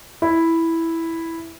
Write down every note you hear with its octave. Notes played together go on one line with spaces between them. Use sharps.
E4